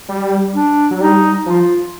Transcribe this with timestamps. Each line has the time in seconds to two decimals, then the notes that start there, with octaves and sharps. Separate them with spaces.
0.09 G3
0.55 D4
0.91 F#3
1.01 G3 D#4
1.46 F3 F4